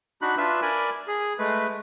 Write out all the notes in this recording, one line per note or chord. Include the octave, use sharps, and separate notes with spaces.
D4 D#4 F#4 B5 F#6
D4 F4 B4 E5 E6
A#4 D5 G#5 B5
G#4
G#3 A3 B4